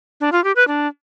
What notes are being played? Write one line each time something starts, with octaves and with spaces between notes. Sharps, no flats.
D4
F4
G4
B4
D4